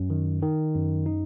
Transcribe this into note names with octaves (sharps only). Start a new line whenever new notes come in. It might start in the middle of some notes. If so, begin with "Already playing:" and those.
Already playing: F#2
D#3
D#3
F#2
D#4